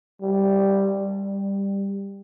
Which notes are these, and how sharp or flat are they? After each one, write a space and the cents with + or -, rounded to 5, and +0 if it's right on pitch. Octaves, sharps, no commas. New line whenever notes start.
G3 +0
G3 +15